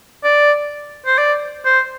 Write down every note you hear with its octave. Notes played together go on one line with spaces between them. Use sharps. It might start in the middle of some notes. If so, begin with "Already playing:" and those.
D5
C5
D5
C5